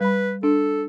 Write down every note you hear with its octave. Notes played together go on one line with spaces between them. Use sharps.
G3 B4 B5
D4 A4